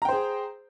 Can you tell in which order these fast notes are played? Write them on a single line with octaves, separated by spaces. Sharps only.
A#5 G5 C5 G#4